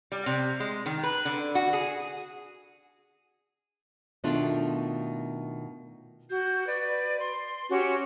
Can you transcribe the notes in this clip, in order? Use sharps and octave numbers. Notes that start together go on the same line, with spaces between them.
G3
C3
G#3
D#3
B4
D3
F#4
G#4
B2 D#3 A3 D4 F4
F#4 G6
B4 D5
C6
C#4 F#4 G4